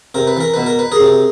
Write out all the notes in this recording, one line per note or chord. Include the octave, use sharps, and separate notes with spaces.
C3 A#4
B4
E3 A#4
B2 B4
A#4
B4
G#4 A#4
C3